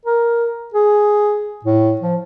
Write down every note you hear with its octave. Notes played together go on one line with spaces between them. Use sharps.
A#4
G#4
A2
F3